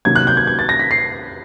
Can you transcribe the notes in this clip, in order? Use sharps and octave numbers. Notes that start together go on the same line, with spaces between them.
C3 D#3 F#3 A#3 G#6
F#6
G6
G#6
G#6
A6
A#6
B6
C7